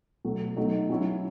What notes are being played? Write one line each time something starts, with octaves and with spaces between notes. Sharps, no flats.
B2 F#3 A3
F#3 A3 D#4
F#3 C#4 E4